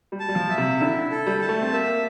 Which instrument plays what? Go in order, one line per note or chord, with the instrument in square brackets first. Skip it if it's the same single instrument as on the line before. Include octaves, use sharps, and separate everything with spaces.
[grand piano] G3
[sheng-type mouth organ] A5
[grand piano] G3
F3
[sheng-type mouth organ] E5
[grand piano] C3
[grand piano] D3 [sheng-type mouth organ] E4
[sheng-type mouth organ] A4
[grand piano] G3
[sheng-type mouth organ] A5
[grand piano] A3
C4
[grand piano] A#3 [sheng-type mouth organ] E5